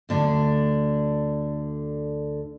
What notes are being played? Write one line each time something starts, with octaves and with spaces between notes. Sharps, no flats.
D2 D3 D4